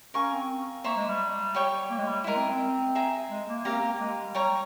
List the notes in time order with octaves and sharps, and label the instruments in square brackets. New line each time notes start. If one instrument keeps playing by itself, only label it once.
[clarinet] C#4 [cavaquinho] A#4 F5 G#5 C#6
[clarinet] C4
[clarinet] A#3 [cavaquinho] C5 E5 A#5 C#6
[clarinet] G#3
G3
[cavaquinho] G4 C#5 G5 C#6
[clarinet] A#3
G#3
G3
[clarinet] G#3 [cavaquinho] E4 G4 A#4
[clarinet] C4
C4
[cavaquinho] G#4 E5 G5 A#5
[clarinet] G#3
A#3
[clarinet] C4 [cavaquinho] G4 A#4 F5 A#5
[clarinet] A#3
G#3
G#3
G3
[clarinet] G3 [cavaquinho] C#5 G5 A#5 C#6